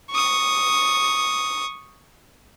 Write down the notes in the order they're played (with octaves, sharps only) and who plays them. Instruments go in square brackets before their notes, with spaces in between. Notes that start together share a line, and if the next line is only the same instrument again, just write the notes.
[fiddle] C#6 D#6